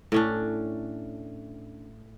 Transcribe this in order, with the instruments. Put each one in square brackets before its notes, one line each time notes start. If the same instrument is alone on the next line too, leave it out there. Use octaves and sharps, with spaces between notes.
[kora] A2 C#4 D4